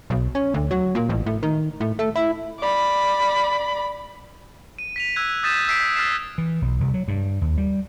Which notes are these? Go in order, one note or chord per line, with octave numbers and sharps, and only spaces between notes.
B1
C#4
D2
F#3
A#2
A1
A2
D#3
A2
A3
E4
D5 B5
D#7
B6 D#7 F7
E6 F#6 G#6
D#6 G6 A6 B6 D#7 E7
E6 B6 C7 D7
F6 A6 B6 C7 E7
E3
B1
C2
F#3
G2
D#2
G3